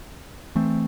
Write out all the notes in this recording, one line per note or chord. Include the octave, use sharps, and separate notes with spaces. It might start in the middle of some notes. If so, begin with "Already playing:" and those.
E3 A3 C4